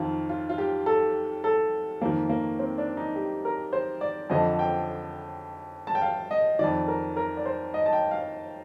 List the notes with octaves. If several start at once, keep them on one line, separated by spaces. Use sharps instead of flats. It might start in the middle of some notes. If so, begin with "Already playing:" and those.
Already playing: F2 D#3 F4
F4
F4
G4
A4
A4
F2 D#3 A#3
A#3
C4
D4
D#4
G4
A#4
C5
D5
F2 D3 F3 D#5
G5
A5
G5
F5
D#5
F2 D#3 D5
A#4
A#4
D5
C5
D#5
A5
G5
F5